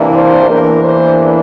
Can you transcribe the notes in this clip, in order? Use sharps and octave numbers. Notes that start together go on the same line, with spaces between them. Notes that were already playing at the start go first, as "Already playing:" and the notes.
Already playing: C3 E3 A#3 D4
C5
E2 E3 A#3 D4 A#4
C5